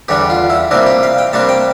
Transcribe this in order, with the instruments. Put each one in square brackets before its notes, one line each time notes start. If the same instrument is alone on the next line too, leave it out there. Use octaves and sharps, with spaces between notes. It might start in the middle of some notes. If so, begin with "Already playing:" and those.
[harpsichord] E2 D3 G3 D4 G4
F4
E4
C3 G3 A#3 D4 E4
G4
F5
G5
C3 G3 A#3 D4 A5
G5